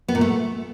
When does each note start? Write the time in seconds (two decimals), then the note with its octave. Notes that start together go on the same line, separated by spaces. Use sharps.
0.08 B3
0.15 A#2
0.21 A3